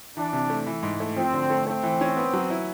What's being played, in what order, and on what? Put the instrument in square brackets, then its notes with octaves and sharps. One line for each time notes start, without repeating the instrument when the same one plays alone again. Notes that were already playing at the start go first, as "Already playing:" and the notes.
[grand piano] E3 [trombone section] D4
[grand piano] C3
A3
E3
G#2
A3
[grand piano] F3 [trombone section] C4
[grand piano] D3
A3
[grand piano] A3 [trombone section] C4
[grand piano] E3
C#4
B3
F#3
E4